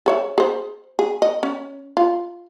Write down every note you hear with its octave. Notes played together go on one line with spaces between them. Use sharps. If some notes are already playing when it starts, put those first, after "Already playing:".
G#4 C#5 E5
G#4 C5
G#4
D#5
C#4
F4